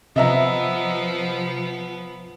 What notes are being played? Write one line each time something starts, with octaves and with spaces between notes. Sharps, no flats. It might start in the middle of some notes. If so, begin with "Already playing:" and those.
C3 F3 B3 D#5 E5 A#5